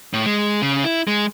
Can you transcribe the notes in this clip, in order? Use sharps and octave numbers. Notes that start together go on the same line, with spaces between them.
A2
G#3
C#3
E4
G#3